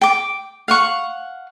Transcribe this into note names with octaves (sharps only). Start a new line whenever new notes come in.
G5 D6
F5 F#5 C#6